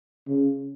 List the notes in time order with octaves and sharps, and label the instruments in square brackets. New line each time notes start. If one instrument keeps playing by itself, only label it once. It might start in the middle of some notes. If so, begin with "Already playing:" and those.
[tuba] C#3